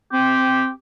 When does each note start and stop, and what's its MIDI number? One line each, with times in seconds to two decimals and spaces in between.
0.13 0.70 60
0.13 0.68 67